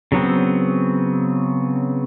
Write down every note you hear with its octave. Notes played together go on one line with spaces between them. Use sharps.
C#3 F#3 B3 C4